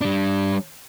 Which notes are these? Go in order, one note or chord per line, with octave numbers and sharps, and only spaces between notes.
G3 D4